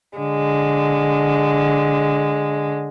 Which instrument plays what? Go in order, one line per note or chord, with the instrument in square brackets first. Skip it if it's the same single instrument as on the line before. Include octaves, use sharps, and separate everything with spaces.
[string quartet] D3 G#3